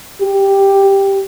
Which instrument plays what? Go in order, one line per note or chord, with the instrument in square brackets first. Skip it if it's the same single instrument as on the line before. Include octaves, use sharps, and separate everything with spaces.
[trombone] G4